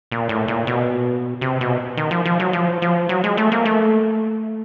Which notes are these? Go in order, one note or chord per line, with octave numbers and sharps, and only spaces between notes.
A#2
A2
A#2
B2
C3
B2
D#3
F3
F3
F#3
F3
F3
F#3
G#3
A3
A#3
A3